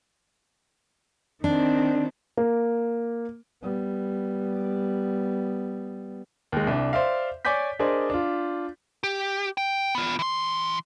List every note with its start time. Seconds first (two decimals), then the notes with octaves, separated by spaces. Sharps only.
1.44 D#3 C4 D4
2.37 A#3
3.63 G3 B3
6.52 D#2 G#3
6.67 C2 D4
6.93 C5 D5 E5 F5
7.45 C#5 D5 G#5 D6 G6 B6
7.79 D4 G#4 A#4 C5 D5 D#5
8.10 D4 F4
9.03 G4
9.57 G5
9.95 B3 F4
10.19 E3 C6